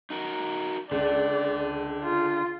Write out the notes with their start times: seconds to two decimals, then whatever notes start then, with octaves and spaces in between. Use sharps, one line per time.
0.10 D#4 F#4 A#4
0.91 C#2 D3 D5
2.04 F4